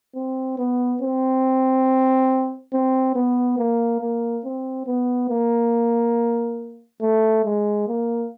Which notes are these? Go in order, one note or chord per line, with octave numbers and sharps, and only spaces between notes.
C4
B3
C4
C4
B3
A#3
A#3
C4
B3
A#3
A3
G#3
A#3